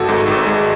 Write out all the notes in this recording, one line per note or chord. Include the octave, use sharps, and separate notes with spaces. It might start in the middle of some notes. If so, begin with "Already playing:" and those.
Already playing: G#1 F#4 A4
G#2
G#1
G#3